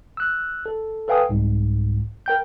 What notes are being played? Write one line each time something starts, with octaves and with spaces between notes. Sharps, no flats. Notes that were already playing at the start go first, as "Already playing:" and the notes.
E6 F#6
A4
A4 B4 F5 G5 G#5 D#6
C2 G#2
A#4 G5 G6